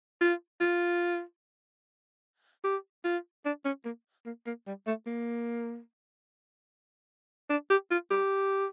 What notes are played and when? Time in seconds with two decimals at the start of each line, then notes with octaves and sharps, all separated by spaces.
0.21 F4
0.61 F4
2.64 G4
3.05 F4
3.45 D4
3.65 C#4
3.85 A#3
4.25 A#3
4.46 A#3
4.67 G3
4.87 A3
5.06 A#3
7.50 D4
7.70 G4
7.91 F4
8.11 G4